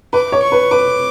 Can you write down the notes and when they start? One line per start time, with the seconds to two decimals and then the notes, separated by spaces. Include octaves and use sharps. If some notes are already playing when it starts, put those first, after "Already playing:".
0.13 B4 D6
0.32 C#5
0.42 C#6
0.52 B4
0.71 B4 D6